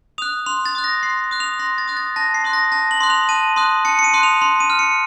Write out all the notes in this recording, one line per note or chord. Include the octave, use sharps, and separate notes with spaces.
D#6 F#6 F7
C6 F7
A6
D#6 F#6
A#6
C6 C7
D#6 F#6
F7
C6 A#6
A6
D#6 F#6
A6
A5 A#6
C7
C6 D#6 F#6
A#6
A5 A#6
F#7
C6 D#6 F#6
F7
A5 D#7
C6 D#6 F#6
A5 C#7
C#7
D#7
C6 D#6 F#6
F7
C6 F7
D#7
F6
C#7